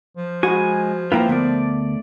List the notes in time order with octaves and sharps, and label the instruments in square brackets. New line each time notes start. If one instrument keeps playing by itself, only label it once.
[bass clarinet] F3
[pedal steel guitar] G#3 G#5 [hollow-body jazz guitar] F#4 F#5 B5
[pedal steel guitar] A#3 E4 F4 [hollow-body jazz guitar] B4 G5 A#5
[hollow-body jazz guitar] D2 B3 A#4 [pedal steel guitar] A3 D5